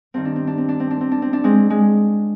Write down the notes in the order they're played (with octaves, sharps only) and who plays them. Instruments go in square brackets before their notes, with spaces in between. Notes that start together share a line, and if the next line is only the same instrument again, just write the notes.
[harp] G2 D#3 C4
D4
C4
D4
C4
D4
C4
D4
C4
D4
C4
D4
G#3 C4
G#3